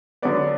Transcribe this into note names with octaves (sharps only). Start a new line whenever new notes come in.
D3 F#3 B3 D5